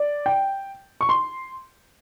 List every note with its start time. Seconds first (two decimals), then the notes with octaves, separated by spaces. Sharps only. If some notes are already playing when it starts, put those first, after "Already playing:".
Already playing: D5
0.26 G5
1.01 C#6
1.09 C6